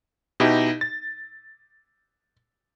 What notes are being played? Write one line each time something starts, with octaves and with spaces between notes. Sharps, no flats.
B2 D#4 E4 G4
A6